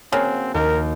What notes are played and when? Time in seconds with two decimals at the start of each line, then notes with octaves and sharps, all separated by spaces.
0.12 C#3 A#3 C4 F#4
0.54 D#2 A#4